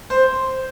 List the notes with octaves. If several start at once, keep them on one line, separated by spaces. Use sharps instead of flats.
C5